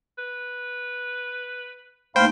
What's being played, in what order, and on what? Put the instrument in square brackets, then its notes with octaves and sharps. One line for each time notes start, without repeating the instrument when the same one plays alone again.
[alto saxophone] B4
[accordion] G2 F5 B5 [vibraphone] A3 A#3 D#4 [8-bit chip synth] C5 G5